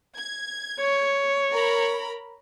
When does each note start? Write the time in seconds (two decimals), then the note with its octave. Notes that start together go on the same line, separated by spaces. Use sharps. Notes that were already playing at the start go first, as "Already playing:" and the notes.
0.16 G#6
0.80 C#5
1.53 A#4 A#5 B5